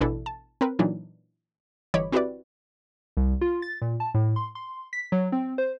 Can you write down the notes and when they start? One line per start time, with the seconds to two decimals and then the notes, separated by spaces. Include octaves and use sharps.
0.01 A1 B2 E3 D4 E4 A4
0.26 A5
0.61 C4 A#4 B4
0.79 A#2 E3 F#3 D4 D#4
1.94 G1 E3 C#5 D#5 B5 D6
2.12 C4 E4 F#4 G4 B4 D5
3.17 C2
3.41 F4
3.62 A6
3.82 A#2
4.00 A5
4.14 A2
4.36 C6
4.55 C6
4.93 B6
5.12 F#3
5.32 C4
5.58 C5